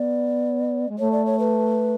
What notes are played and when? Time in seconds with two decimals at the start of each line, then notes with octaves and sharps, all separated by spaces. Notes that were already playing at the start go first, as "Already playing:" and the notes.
Already playing: B3 D5
0.88 G#3
0.99 A3 C#5
1.12 D5
1.26 C#5
1.39 B4